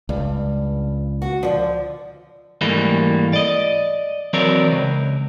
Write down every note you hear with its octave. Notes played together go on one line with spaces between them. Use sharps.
C#2 G2
F#4
D#2 D3 F3
G#2 E3 G3 A3 A#3
D5 D#5
E3 F#3 C4 A#4 C#5 D5
C#2